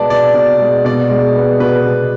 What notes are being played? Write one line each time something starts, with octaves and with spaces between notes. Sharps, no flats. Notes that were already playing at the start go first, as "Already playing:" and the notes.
Already playing: B2 G#3 B3 D5 A5
B2 D5
B2
G#3
B2 D5
G#3
B3
B2 B4
B2